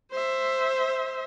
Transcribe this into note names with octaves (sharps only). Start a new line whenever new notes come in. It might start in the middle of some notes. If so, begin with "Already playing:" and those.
C5 E5